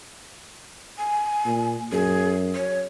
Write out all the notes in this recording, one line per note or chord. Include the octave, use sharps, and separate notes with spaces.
G#5
A#2
F#2 G#4
C#5